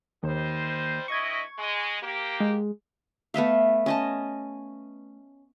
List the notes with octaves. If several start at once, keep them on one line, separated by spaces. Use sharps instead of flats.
D#2 G3 D#4 C5
G2 E4 D#5 C#6 G#6
G#3
A#3 G4
G#3
A3 B3 E5 F5
C#4 D#5 A5